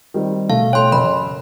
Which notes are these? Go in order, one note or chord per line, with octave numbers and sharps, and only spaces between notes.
D#3 G3 C4
B2 A3 F5
A3 C#5 G5 C6
F#1 B5